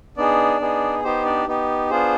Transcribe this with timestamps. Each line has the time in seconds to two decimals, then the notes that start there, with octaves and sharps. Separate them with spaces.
0.17 B3 D4 D#4 G#4 D5
0.61 B3 D#4 G#4
1.03 B3 D#4 G4 C5
1.25 D4 D5
1.47 B3 D#4 G4
1.90 B3 D4 F4 G#4 C5